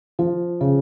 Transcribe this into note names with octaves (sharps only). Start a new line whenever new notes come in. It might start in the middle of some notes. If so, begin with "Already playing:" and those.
F3
C#3